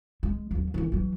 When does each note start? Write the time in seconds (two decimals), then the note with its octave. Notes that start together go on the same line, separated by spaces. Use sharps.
0.23 G#3
0.51 D#2 F#3
0.74 D#3 E3
0.92 E3 F#3